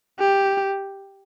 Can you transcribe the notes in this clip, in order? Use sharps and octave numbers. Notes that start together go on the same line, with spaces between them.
G4